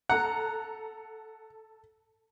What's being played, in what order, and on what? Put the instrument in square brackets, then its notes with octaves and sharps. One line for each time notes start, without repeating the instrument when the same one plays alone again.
[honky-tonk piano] A4 A#5 [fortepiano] F#5